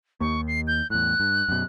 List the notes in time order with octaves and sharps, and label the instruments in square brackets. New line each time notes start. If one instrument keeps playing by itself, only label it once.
[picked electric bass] D#2 A#3 [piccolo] C#6
[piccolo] C7
G6
[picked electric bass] E2 A2 [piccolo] F#6
[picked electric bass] G2
F#2 B2